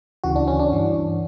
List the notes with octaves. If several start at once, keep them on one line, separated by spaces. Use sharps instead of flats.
D2 C#3 E3 F#4
D4
C#4
D4
G2 E3